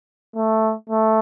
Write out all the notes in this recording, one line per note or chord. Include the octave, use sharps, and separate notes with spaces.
A3
A3